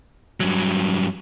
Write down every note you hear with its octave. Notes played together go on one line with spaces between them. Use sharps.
G2 F#3